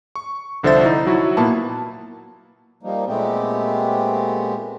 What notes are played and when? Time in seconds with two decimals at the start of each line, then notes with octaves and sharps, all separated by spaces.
0.15 C#6
0.63 C2 D3 F3 C5 E5 A6
0.85 D#4 E4
1.06 F#3 E4 F#4
1.37 A#2 A#3 B3 E4 A5
2.83 F3 G3 A#3 D#4
3.07 A#2 G#3 A3 B3 C4 G4